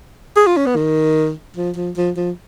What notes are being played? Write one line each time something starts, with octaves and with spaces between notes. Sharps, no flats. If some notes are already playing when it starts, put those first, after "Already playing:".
G#4
F4
C#4
B3
D#3
F3
F3
F3
F3